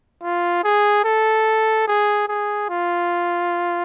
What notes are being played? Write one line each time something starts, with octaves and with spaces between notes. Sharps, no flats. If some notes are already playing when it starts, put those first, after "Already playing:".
F4
G#4
A4
G#4
G#4
F4